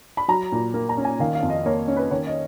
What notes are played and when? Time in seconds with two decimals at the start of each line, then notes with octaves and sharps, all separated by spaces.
0.17 B5
0.28 F#3 A#5
0.52 A#2
0.74 A#3
0.89 A#5
0.97 C#4
1.05 G#5
1.19 D#3 F5
1.35 F5
1.42 F2
1.50 D#5
1.66 A#3 C#5
1.88 C#4
1.96 B4
2.11 D#3 C#5
2.27 D#5